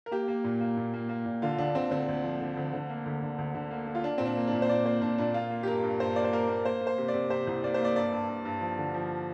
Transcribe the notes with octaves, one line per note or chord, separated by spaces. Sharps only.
A#4
A#3 G4
A#3
A#2
A#3
A#2
A#3
A#3
A#2
D3 F4
D2 D4
D3 C4
D2 C4
D2
F3
D3
D2
D3
A#3
D2
D3
D2
D3
A#3
A#3
F4
A#3 D4
A#2 C4
D4
A#3
D4
A#2
C5
A#2 D5
A#3 C5
A#2 D4
A#2 D4
A#3 F4
A#3
G4
G2 A#4
G2
G2 C5
A#3 D5
C5
A#3 A#4
A#3
A#3 C5
A#3
C5
C3
D5
C3
C3 C5
C2
A#3 D5
C5
A#3 D5
G2 D5
G2
G2
G2
F3
D3
F3